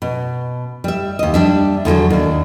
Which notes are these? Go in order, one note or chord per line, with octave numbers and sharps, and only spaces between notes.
B2
G3 E5
D#2 D#5
G3 D4 E5
E2 D3 F3 F#3
D#2 D4